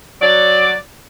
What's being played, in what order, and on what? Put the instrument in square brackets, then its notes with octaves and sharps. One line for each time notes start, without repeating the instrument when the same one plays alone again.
[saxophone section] F#3 D5